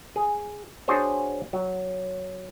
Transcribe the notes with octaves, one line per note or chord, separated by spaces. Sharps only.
G#4
D4 F#4 G#4 C5 C#5
F#3